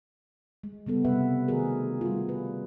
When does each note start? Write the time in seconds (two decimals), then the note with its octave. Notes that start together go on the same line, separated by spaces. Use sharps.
0.64 G#3
0.86 C#3 G3 B3 A4
1.04 C3 G3 B4 E5 F#5
1.48 D#3 A3 F#4 G#4 A#4
2.01 G3 F4
2.29 B4